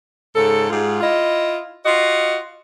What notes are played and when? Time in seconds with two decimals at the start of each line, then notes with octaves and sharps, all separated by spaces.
0.35 G#2 C#3 A4
0.70 G#2 F4 G4 G#4
1.01 E4 F4 D#5
1.85 F4 F#4 D#5